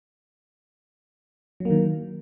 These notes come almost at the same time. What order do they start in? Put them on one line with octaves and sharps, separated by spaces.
F#3 A#3 D#3